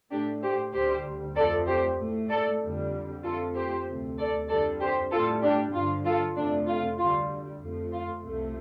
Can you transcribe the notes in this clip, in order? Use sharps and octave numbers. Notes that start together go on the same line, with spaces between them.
A2 A3 D4 G4
G4 C5
D2 D3 G3 G4 C5
F2 F3 A3 A4 D5
G4 C5
A2 A3
A4 D5
F2 D3 G3
F2 F3 A3 F4 A4
G4 C5
D2 C3 A3
A4 D5
F2 D3 G3 A4 D5
G4 C5
A2 G3 F4 A4
D4 G4
G2 D3 F3 F4
F4 A4
F2 C3 F3 A3 D4
F4
D2 D3 G3 F4
F2 F3 A3
F4
C2 C3 F3 A3